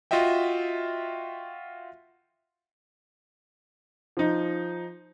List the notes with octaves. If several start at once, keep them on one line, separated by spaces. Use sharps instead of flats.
F4 F#4 D#5 E5 G5
F3 D#4